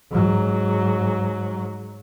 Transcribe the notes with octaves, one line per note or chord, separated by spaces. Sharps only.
G#2 F#3